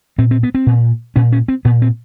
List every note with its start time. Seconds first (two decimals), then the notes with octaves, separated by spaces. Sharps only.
0.18 A#2 C4
0.31 C4
0.43 B3
0.55 C4
0.67 A#2
1.16 A#2 C#4
1.32 C#4
1.48 C4
1.65 A#2 B3
1.82 C4